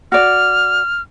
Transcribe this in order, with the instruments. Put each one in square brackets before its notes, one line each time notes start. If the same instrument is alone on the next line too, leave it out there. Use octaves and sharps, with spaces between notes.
[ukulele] F#4 D5 [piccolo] F6